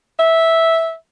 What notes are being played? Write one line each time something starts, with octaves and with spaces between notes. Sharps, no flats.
E5